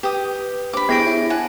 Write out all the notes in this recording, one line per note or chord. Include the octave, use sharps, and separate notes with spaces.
G4 B4 D#6
D4 G4 C5 B5 D6
B3 E4 G#4 G5 A#6 D7
E4 C#5
F#5 G#5 A5